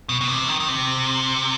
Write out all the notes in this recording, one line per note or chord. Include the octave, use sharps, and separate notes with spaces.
B2
B2
C3
D#3
D#3
C3